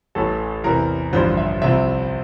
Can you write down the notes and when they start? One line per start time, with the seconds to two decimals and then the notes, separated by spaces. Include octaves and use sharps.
0.15 A1 A2 E3 A4
0.64 E2 C3 E3 A#4
1.13 A1 G2 D3 F3 C5
1.37 E5
1.62 C2 C3 F3 E5